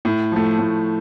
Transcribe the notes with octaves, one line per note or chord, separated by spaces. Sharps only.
A2
F3 A3
A2